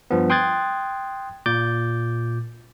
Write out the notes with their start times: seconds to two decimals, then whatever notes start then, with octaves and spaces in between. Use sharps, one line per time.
0.11 G2 F3 B3
0.30 G5 C6 D#6 F#6 G#6 A6
1.46 A#2 D6 G6 A6